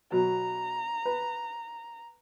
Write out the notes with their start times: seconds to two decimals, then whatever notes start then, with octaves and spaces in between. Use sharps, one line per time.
0.12 B2 F#3 A#5
1.05 B4